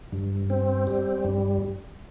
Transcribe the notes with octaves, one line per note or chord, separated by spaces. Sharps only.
G2
C4
G3
G2